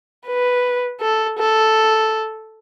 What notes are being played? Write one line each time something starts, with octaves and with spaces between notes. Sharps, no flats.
B4
A4
A4